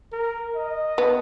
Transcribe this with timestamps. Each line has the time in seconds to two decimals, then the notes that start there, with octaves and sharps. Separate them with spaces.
0.13 A#4
0.55 D#5
0.98 B3